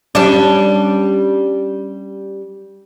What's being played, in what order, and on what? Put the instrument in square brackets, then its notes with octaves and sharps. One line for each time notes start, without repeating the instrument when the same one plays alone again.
[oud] G3 C#4 D4